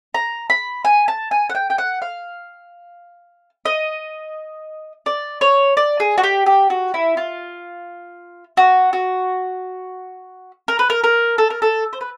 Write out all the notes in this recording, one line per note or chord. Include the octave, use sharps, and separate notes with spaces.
A#5
B5
G#5
A5
G#5
F#5
G5
G5
F#5
F5
D#5
D5
C#5
D5
G#4
F#4
G4
G4
F#4
E4
F4
F#4
F#4
A#4
B4
A#4
A#4
A4
A#4
A4
C5
B4